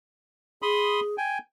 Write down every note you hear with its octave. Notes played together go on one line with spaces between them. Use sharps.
G#4 B5 C6 D#6
G5 G#5